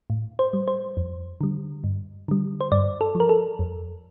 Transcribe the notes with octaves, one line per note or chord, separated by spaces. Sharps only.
A2
C5
G3
C5
F2
D3 G3
G2
D3 G3
C5
G2 D5
A4
F3
A#4
A4
F2